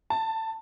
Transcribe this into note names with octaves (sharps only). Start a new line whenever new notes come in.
A5